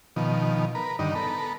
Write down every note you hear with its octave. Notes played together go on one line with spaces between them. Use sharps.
B2 D#3 F3
A#4 B4
G2 D3 D#3 D#4
B3 A4 A#4 B5